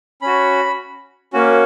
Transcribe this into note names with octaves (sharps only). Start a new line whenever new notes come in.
C#4 F#4 B5
A#3 C#4 F#4